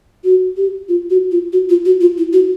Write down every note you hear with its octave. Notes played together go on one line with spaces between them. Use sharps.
F#4
G4
F4
F#4
F4
F#4
F4
F#4
F4
E4
F#4